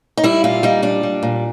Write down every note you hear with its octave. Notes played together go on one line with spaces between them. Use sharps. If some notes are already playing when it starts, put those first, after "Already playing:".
D#4
G3 E4
A#2 F4
G3 D#4
A#2 D4
G3
A#2